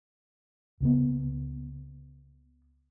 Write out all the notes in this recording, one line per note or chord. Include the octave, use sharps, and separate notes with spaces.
C#2 C#3 B3